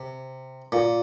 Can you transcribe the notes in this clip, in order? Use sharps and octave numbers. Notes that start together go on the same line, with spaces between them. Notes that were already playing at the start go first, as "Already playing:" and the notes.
Already playing: C3
A#2